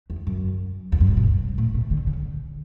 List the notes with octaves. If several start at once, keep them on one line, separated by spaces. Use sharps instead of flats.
E2
F#2
E2
F#2
G#2
B2
A2
B2
D3
C#3